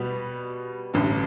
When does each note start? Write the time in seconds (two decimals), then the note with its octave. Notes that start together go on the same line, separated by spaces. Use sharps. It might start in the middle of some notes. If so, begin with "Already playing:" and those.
Already playing: B2 G3 B3
0.94 A1 G2 D3